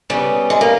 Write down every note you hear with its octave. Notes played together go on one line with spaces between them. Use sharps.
C#3 G3 B3
G#3
A#3